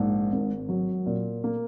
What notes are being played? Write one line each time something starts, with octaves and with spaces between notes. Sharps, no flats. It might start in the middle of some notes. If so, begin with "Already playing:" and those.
Already playing: A#1 G#2
G#1
F#3
A#2
A#3